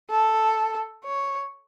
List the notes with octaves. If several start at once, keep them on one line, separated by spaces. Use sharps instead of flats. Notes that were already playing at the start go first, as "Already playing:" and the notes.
A4
C#5